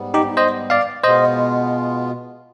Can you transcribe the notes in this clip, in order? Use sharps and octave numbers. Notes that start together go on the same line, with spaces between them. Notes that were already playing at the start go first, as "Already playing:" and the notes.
Already playing: G#2 G3 B3
D#4 G4
C5 D#5
D5 F5
B2 G#3 B3 F4 C5 D#5